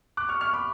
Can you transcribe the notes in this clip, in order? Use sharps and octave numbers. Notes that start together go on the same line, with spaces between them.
D6 F#6
C#6 F6
C#6 F6
B5 D6